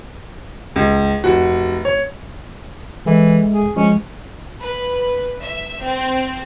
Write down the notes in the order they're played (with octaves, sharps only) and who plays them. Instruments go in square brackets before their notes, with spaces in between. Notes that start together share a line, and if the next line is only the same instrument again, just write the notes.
[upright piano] C#2
F1 F#4
C#5
[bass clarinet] E3 [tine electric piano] G#3 A4 E5
[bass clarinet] G#4
[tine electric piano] F3 G#3 [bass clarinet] C#4
[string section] B4
E5
C4